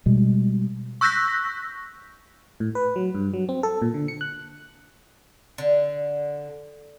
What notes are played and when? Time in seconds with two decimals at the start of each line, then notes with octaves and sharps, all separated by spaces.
0.06 B2 G3 G#3
1.01 C#6 E6 F#6 G6 A#6 B6
2.60 A2
2.75 B4
2.96 F#3
3.15 G2
3.34 F#3
3.49 C4
3.63 A4
3.82 A#2
3.94 D3
4.08 C#7
4.21 F#6
5.58 D3